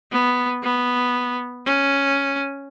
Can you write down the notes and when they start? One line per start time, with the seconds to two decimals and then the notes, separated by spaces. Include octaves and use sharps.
0.11 B3
0.63 B3
1.66 C#4